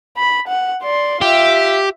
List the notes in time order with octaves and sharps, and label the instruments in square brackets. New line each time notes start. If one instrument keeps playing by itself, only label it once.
[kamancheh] B5
F#5
D5 C6
[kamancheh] F4 E5 [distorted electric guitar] G4